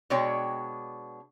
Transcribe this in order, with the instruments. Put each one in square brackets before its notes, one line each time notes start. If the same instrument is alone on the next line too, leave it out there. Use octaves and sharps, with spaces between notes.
[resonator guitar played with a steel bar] B2 G#3 D4 C#5 G5